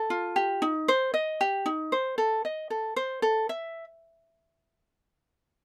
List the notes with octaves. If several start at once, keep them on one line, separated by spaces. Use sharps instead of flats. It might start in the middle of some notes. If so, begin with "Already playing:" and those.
Already playing: A4
F4
G4
D#4
C5
D#5
G4
D#4
C5
A4
D#5
A4
C5
A4
E5